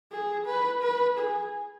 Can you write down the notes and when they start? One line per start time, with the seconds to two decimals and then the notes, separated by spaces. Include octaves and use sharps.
0.12 G#4
0.47 B4
0.82 B4
1.18 G#4